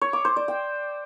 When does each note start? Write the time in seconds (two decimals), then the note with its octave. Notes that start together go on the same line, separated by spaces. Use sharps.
0.02 C#5
0.13 D6
0.25 C5
0.36 D5
0.48 G5